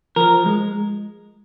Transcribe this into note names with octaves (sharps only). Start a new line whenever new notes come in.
F3 A#4
G#3